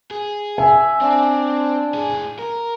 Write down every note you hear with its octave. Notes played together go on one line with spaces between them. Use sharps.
G#4
E5 G#5
C4 D4
A2 G#4
A#4